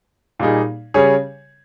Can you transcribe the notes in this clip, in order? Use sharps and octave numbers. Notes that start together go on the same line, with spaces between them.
A#2 G3 A#3 D#4 G#4
C#3 G3 C#4 G#4 C#5